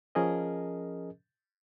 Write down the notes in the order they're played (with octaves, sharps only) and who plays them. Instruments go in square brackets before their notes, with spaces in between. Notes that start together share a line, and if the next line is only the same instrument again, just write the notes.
[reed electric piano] F3 C#4 G#4 A#4 D#5